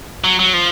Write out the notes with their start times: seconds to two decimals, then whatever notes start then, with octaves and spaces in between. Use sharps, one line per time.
0.24 F#3
0.39 F#3
0.54 F3